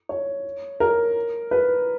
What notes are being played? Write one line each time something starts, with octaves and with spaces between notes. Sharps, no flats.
C#5
A#4
B4